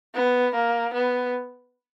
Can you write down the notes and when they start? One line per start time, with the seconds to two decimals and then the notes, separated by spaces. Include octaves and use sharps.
0.15 B3
0.55 A#3
0.93 B3